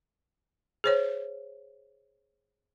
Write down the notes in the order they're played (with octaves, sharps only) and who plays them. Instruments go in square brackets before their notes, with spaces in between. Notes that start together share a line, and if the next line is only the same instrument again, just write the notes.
[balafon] G#4 C5 C#5